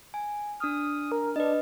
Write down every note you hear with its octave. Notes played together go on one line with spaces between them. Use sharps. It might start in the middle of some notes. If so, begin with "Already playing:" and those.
G#5
D4 D#6 F6
A#4
D4 B4 D#5